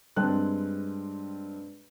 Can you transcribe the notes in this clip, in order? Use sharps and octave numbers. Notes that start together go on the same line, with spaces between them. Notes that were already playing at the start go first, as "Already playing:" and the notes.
G2 G#3 C4 G5 A5 F#6